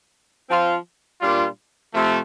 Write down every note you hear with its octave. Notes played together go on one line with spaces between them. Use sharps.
F3 C4 F4
A#2 G3 D4 F4
C3 F3 A3